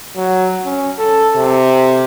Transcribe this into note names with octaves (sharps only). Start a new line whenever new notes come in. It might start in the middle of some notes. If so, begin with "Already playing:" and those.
F#3
C#4
A4
C3